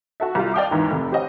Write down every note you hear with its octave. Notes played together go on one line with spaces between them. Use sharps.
F#4 A4 E5
C2 G3 F4
D5 D#5 F5 G5 A5 D6
D#2 G#2 E3
F1 C3
G4 C5 C#5 D#5 F#5